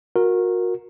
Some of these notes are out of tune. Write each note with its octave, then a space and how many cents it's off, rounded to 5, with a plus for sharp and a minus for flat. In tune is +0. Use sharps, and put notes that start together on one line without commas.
F#4 -30 A#4 +0